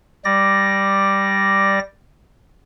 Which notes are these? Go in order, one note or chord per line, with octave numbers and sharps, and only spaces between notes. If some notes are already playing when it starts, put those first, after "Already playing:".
G3 D5 A#6